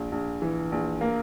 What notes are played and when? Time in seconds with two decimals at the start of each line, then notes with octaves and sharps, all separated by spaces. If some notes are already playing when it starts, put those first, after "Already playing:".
Already playing: A#1
0.12 A#1
0.42 E3
0.72 A#1
1.01 A#3